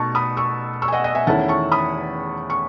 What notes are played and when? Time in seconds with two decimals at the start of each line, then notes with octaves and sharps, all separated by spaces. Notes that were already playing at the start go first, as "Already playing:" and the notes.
Already playing: B2 A3 D#4 A5 C#6
0.15 B5 D#6
0.37 C#6 E6
0.82 C#6 E6
0.88 G#5
0.92 D#5 F#5
1.04 D#5 F#5
1.15 E5 G#5
1.27 E2 D#3 A3 C#4 E4 F#5 A5
1.48 A5 C#6
1.72 B5 D#6
2.50 C#6